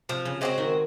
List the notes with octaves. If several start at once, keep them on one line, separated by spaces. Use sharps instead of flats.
C3 F3
C#3
C#3 G#3 C4 F#4
D#3